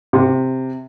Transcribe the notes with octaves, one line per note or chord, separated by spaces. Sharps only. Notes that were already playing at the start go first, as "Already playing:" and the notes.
C3